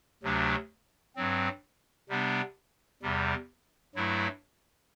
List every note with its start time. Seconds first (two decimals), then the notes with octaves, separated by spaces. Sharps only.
0.23 D2 C3 F#3 A3 D4
1.16 G2 F#3 C4
2.09 C3 G3 B3 D4
3.02 E2 C3 G3
3.95 G2 F#3 A3 E4